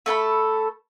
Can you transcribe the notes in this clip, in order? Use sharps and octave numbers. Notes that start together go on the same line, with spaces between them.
A3 A4 F#5 B5